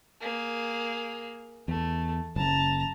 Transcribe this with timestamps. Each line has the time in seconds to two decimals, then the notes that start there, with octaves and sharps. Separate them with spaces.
0.21 A#3 G#4
1.68 E2 A3
2.36 F#1 C#3 A5 A#5